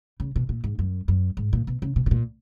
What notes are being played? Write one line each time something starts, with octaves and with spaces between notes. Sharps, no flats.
C#3
B2
A#2
G#2
F#2
F#2
G#2
A#2
B2
C#3
B2
B2
A#2